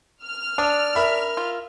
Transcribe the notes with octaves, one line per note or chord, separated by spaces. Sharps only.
F6
D4 D#6
A#4 E5 B5
F4